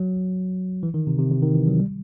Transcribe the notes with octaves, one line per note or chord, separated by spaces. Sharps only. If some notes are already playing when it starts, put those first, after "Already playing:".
Already playing: F#3
E3
D#3
C3
C3
C3
D#3
E3
F#3
G3